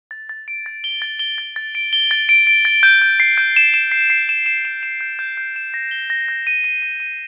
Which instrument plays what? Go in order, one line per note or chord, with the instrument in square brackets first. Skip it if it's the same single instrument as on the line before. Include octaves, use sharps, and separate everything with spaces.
[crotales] A6
A6
D7
A6
G7
A6
G7
A6
A6
D7
G7
A6
D7
D7
A6
G6
G6
C7
G6
E7
E7
C7
C7
E7
E7
E7
E7
G6
G6
G6
E7
A#6
G7
A#6
G6
D#7
D#7
A#6
D#7